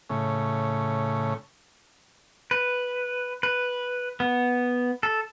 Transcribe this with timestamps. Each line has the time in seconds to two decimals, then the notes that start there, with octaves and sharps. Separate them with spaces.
0.10 A2 C#3
2.51 B4
3.43 B4
4.20 B3
5.03 A4